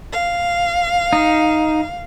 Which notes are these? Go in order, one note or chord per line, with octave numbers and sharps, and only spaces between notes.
F5
D#4